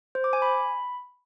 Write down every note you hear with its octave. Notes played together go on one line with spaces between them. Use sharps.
C5
D6
G#5
B5